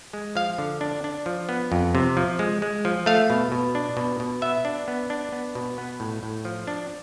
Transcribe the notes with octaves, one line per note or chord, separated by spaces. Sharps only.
G#3
F3 F5
D3
D4
D4
F3
B3
F2
C3
F3
G#3
G#3
F3
A3 F5
B2
B2
D4
B2
B2
B3 E5
D4
B3
D4
B3
B2
B3
A2
A2
F3
D4